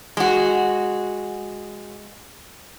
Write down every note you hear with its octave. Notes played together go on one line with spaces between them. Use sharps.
G#3 F#4